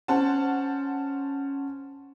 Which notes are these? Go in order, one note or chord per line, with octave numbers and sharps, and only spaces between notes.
C#4 C5 F#5 A5